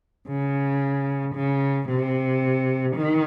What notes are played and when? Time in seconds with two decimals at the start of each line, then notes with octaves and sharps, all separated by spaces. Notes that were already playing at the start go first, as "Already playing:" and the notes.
0.27 C#3
1.35 C#3
1.88 C3
2.96 D#3